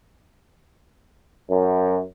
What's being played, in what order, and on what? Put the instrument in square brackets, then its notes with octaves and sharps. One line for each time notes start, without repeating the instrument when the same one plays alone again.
[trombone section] F#2